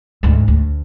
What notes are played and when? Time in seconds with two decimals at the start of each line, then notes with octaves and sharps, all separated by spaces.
0.23 D2 G#2
0.48 D2